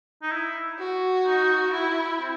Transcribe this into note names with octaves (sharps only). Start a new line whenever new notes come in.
D#4
E4
F#4
D#4
E4
C4